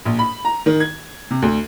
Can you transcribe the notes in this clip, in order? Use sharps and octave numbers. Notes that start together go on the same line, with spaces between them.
A#1
B5
A#5
D#3
G#6
C3
D2